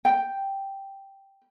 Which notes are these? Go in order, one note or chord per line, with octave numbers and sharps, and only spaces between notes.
G5